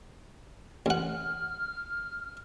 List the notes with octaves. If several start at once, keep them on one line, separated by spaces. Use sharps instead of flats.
A1 F#5 F6